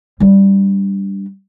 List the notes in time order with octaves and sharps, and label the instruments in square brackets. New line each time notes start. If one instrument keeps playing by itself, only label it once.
[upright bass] G3 D4